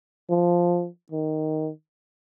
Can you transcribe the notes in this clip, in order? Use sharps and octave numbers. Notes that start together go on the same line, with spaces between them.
F3
D#3